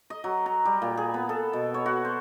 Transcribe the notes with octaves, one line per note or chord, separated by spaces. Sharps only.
D#5
F#3
A#5
G3
A#2
G#4
B3
A4
B2
C#5
F#4
C5